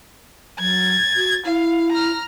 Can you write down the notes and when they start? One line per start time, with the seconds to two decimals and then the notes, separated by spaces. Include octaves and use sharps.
0.59 F#3 G#6 A6
1.16 F#4
1.46 E4 F5
1.92 A#5 F6